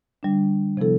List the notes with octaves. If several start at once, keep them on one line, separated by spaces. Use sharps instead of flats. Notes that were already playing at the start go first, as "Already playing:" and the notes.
D3 G3 D4
C3 F3 B3 E4 A4